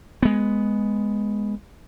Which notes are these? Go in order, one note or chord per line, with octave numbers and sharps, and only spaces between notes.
G#3 B3